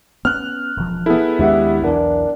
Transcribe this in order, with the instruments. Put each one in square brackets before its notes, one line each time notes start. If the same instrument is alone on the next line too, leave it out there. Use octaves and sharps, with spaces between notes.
[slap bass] B3 C#4 [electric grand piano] F6 F#6
[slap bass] E1 F3
[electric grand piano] B3 E4 [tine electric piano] G#4 A4
[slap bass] D#2 D4 [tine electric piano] G#3 G4 F#5 [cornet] E5
[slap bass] B1 E2 E3 [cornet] D4 [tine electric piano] A#4 F#5